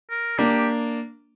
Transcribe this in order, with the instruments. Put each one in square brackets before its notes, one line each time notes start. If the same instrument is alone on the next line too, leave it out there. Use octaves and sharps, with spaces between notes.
[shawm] A#4
[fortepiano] A#3 D4 [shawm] G4